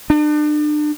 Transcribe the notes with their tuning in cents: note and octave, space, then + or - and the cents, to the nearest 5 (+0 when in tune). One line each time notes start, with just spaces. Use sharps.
D4 +35